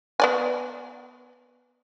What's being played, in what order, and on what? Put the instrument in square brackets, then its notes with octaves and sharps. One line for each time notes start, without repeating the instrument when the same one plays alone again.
[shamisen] B3 D5 G#5